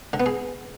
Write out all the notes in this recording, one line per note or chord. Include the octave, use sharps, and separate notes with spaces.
D3
B3
G#4